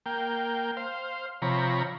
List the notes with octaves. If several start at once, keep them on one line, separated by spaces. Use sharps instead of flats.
A#3 G5
C5 F5
C3 F3 C#5 A#5 B5